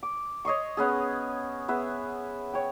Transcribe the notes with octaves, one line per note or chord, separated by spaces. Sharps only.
D6
C#5 D#5 C6 C#6
B3 C#4 G#4
B3 G#4 E5
C#5 G5